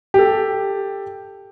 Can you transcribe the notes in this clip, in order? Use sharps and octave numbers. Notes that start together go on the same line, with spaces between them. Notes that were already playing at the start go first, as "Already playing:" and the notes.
G4 A4